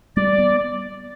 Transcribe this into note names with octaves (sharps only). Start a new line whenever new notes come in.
G3 D5
B3